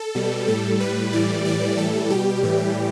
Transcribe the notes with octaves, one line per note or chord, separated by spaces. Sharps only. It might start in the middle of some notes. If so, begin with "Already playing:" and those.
Already playing: A4
B2 G3
A2 G3 A4
A2 G3 B4
A2 E3 G3 D5
A2 E3 G3 D5
A2 E3 G3 A4
B2 G3 G4
A2 E3 G3